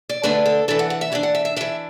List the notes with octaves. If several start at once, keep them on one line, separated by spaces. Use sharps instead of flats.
D5
D3 A3 D4 B4
A4
E3 D4 A4
F#5
F#5
E5
E3 D4 D5
F#5
E5
E5
E3 D4 E5